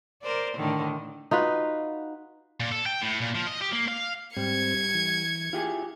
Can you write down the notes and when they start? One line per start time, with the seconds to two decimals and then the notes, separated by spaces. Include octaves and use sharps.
0.22 A#4 C5 D5
0.56 A2 D3 D#3
1.31 D#4 F4 F#4 B4
2.60 A#2
2.72 A4
2.86 G5
3.01 A2
3.20 A#2
3.35 F3
3.46 D#5
3.61 G4
3.72 A#3
3.88 F5
4.37 G#2 G3 C4 G#6 C#7
4.94 E3
5.53 E4 F4 G4 G#4